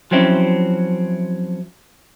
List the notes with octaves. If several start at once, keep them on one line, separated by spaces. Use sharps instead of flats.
F3 F#3 C4 C#4 E4